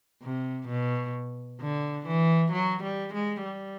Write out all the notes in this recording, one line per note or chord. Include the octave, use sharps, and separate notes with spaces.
C3
B2
D3
E3
F#3
G3
G#3
G3